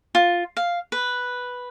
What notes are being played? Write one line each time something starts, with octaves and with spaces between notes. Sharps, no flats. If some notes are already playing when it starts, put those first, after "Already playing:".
F4
F5
B4